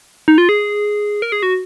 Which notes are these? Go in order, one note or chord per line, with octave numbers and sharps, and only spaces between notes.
D#4
F4
G#4
A#4
G#4
F#4